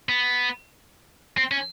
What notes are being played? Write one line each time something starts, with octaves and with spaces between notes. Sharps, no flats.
B3
C4
C#4